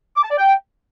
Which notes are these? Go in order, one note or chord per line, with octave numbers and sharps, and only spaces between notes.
D6
A5
D5
G5